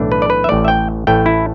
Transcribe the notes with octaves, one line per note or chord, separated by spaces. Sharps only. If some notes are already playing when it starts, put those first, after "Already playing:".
Already playing: B1 A2 E3 A3 D4
B4
D5
B4
E5
A1 A2 A3 D5
E5
G5
A1 A2 A3 G5
E4